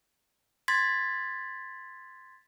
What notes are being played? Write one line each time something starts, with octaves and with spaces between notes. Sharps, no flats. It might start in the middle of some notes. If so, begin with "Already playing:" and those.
C6 G#6 A6 B6